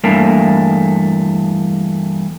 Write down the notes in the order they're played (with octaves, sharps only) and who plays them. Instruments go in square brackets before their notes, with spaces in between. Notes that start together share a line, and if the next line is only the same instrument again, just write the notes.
[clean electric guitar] E2 G2 A3 A#3